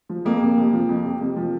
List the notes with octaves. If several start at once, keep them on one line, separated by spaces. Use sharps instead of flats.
F3
F2 A#3
C3
F2
F3
F2
C3
F2
F3